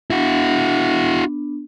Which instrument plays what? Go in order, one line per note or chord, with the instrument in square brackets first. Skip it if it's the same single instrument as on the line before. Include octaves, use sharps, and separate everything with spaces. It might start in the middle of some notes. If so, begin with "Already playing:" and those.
[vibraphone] B3 D4 [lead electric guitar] E4 F#4